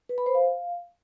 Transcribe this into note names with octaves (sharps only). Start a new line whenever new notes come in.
B4
B5
C5
F5